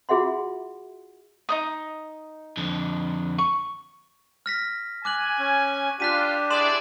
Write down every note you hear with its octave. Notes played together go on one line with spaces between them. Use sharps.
F4 F#4 G#4 E5 F#5 C6
D#4 C5 D#6
F2 D3
C#6
F6 A#6 B6
G#5 D6 F#6 F#7
C#4
D4 F4 G4 F#6 B6 D#7
E4 G#4 D5 C6 E7 F#7